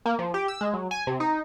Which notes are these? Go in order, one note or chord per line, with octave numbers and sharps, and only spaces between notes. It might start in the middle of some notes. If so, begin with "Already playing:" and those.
A#3
F3
G4
E6
G#3
F#3
G#5
C3
D#4